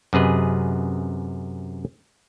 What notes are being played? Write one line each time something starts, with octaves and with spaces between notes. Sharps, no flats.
F#2 C3 G#4 B4 D#5